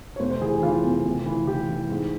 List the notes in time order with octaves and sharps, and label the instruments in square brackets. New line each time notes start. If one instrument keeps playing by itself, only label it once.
[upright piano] C#5
F1 C5
C5
E3 G#4
G4
E3 F4
F1
C3
E3
E3 G4
E3
G#2